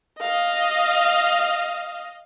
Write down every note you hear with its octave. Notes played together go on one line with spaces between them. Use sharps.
D#5 F5